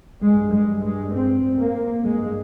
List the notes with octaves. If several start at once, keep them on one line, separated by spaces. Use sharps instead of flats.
G2 G#3
G#3
G#3
C4
A#3
G2 G#3